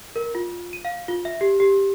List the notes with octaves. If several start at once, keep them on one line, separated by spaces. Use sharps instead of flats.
A#4
F4
D#7
F5
F4
E5
G4
G4